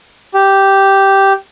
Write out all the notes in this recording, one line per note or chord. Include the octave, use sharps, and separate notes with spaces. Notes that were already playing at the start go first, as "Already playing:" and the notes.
G4